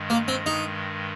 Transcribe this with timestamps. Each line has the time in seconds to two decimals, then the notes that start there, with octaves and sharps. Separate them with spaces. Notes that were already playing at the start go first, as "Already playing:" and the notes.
Already playing: G2 D#3 G#3
0.10 A#3
0.28 C4
0.46 D#4